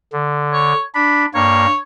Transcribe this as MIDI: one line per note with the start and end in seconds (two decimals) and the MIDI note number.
0.13 0.73 50
0.53 0.81 73
0.95 1.26 62
0.95 1.24 83
1.34 1.66 43
1.34 1.66 58
1.34 1.76 73